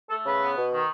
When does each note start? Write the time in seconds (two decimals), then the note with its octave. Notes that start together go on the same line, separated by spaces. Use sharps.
0.09 A3 A4
0.24 C#3 B4
0.40 B3
0.56 B2
0.72 D#3